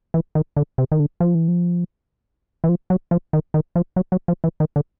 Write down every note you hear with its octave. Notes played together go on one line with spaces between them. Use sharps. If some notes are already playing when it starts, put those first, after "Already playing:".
E3
D#3
D3
C3
D#3
D3
F3
E3
F3
E3
F3
F#3
F3
D#3
D#3
F3
F#3
F#3
F3
E3
D#3
D3